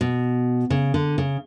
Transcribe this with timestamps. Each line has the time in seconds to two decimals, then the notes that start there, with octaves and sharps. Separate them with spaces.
0.01 B2
0.70 C#3
0.94 D3
1.18 C#3